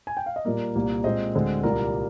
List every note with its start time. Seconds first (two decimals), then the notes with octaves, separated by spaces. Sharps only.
0.07 G#5
0.17 G5
0.26 F5
0.36 D#5
0.45 A#2 G3 A#3 A#4 D5
0.75 C2 A#2 G3 A#3
1.04 A#2 G#3 C4 C5 D#5
1.35 D2 D3 G#3 C4
1.63 C2 A#2 G3 A#3 A#4 D5